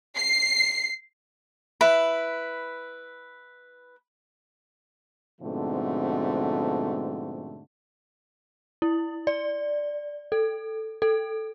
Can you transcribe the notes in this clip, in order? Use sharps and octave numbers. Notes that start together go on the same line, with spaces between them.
C7
E4 B4
G#2 B2 D3 F3 A3 C4
E4
D5
A4
A4